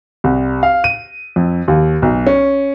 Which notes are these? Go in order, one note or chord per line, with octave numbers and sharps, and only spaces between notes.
C2
F5
D#7
F2
D#2
B1
C#4